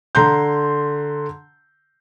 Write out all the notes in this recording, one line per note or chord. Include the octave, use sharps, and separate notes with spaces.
D3 A#5 C6 G6